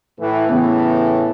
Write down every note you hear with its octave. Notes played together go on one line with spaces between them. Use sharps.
A2 E3
A2 C#3 E3 B3